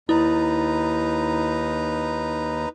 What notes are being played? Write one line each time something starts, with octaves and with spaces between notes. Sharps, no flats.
D#2 D#4 E4 B4 A#5